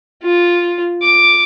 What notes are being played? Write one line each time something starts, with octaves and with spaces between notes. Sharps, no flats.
F4
D6